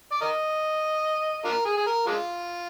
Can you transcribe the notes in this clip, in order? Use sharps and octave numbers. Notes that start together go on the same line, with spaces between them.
D5
A#4 D#5
D4 F4 A#4
G#4
G#4
A#4
G#3 D4 F4